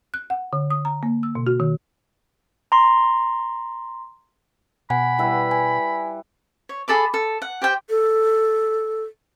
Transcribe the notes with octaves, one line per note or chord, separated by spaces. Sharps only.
F#6
F#5
D3
D#6
A#5
A#3
E6
B2
F#4
D#3
A#5 C6
B2 F#5 G#5 B5
G3 E4 B4
G#5
C#5
G#4 A4 B5 D6
A4
F#5
G4 C5 G5
A4